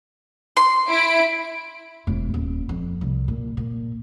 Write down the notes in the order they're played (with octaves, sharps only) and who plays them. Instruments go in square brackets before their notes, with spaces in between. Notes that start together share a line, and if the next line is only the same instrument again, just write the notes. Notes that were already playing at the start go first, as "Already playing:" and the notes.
[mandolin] C6
[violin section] E4 D7
[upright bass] E1
D#1
F2
C2
A#2
A#2